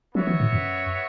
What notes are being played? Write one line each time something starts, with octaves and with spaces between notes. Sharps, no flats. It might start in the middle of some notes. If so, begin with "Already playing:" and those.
F#3 B3 F#4 C#5 E5
E3
A2
F#2